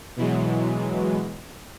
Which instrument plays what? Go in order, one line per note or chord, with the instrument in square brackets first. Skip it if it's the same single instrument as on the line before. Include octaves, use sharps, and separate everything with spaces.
[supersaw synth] B2 E3 F#3 G#3